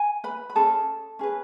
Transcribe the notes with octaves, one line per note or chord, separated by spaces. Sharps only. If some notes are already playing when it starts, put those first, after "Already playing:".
Already playing: G#5
B4 B5
B5
C#4 G#4 A4 A5
C#4 G#4 B4